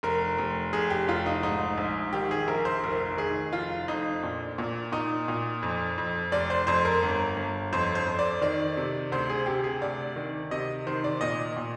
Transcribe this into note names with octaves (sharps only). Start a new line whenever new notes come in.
F1 A#4
F1
F1 G#4
G4
F1 F4
D#4
G#2 D#4
A#1
D#3 G4
G#4
A#1 A#4
C5
F1 A#4
D#3 G#4
F1 F4
F2 D#4
A#2 D4
A#2
A#2 D#4
A#2
F2
F2
F1 D5
C5
F2 C5
A#4
G1
G1
F2 C5
C5
F2
D5
D#3 D5
C3
D2 C5
G#4
C3 G4
G#4
D2 D5
D#3
C3 D#5
D#3 C5
D5
A#2 D#5
A#2